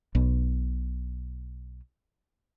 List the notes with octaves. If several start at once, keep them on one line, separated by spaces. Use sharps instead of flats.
B1 B2